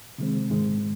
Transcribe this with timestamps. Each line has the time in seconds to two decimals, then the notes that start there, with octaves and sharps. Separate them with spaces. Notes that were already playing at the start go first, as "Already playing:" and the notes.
0.18 C3 D#3 G#3 C4
0.50 G#2 D#3 G#3